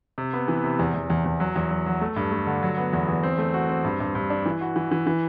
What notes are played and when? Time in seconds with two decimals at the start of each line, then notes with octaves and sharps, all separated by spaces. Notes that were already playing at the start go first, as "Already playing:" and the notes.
0.18 C3
0.33 B3
0.48 E3
0.64 C3
0.79 E2
0.94 E2
1.10 E2
1.25 E2
1.40 F#3
1.56 E2
1.71 F#3
1.86 F#3
2.01 A3
2.16 G2
2.32 A3
2.47 D3
2.63 F#3
2.77 B3
2.93 E2
3.08 E2
3.23 C4
3.38 A3
3.54 F#4
3.69 C4
3.84 G2
4.00 G2
4.15 G2
4.30 D4
4.46 E3
4.61 F#4
4.76 E3
4.92 E3
5.07 E3